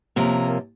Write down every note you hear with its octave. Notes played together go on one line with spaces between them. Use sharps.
C3 F3 A#3 C#4 A#4